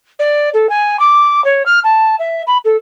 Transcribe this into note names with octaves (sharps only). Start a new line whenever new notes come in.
D5
A4
G#5
D6
C#5
F6
A5
E5
B5
A4